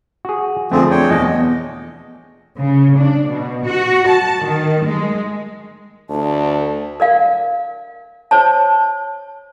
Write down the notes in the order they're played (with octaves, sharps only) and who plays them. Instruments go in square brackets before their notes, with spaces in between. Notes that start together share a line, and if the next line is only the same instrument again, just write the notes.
[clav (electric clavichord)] F#4 G#4
[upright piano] F2 [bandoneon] D3 F3 C4 [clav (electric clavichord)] A3 G#4
[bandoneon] D4 C#5 G5
[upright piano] E2 B2 [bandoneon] D#5
[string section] C#3
D4
B2
F#4
A5
D#3
G#3
[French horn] D2 [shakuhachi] A5
[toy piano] A#4 D5 F5
C5 C#5 A5